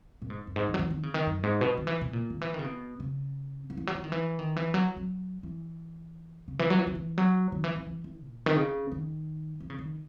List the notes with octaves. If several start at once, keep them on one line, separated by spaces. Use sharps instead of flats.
A#2
G#2
F#2
G#2
E3
F#3
E3
D#3
C#3
D#3
F#2
G#2
B2
D#3
E3
B2
A#2
D#3
E3
D#3
C#3
B2
C#3
D#3
E3
F#3
E3
D#3
E3
D#3
E3
F#3
F#3
E3
C#3
E3
F#3
E3
D#3
E3
F#3
D#3
E3
E3
E3
E3
A#2
D#3
C#3
D#3
E3
C#3
D#3